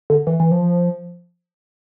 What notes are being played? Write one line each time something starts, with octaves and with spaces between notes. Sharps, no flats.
D3
E3
E3
F3